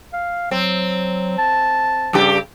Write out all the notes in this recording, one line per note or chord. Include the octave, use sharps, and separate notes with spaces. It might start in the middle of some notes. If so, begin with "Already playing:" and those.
F5
F#3 C4
A5
G2 C#3 G4